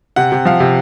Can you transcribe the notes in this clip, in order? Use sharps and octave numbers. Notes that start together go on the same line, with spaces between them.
C3 F#5
C3
F3 F5
C3